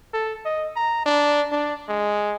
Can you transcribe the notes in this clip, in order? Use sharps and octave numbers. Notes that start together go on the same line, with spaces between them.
A4
D#5
A#5
D4
D4
G#3